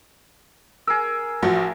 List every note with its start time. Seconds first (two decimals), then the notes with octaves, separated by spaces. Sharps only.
0.87 G#4 A#4 E6
1.43 A1 F3 F#4